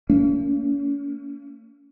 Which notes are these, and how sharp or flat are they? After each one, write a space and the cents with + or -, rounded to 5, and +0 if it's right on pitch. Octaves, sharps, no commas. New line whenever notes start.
A#3 -40 C#4 +40